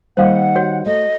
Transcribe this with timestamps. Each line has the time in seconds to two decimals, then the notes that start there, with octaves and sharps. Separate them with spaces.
0.17 D#3 G3 A#3 C5 F5 F#5
0.55 F#4 C#5
0.86 A3 D#5